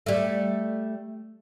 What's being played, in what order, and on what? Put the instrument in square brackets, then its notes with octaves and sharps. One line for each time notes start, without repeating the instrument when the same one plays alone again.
[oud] G3 A3